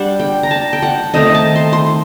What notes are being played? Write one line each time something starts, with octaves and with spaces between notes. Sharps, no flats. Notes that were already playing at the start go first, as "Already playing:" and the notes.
Already playing: G3 D4 F#5
G5
A#5
A5
G5
F#5
D#3 A3 C4 D#4 D#5
A5
C6
C6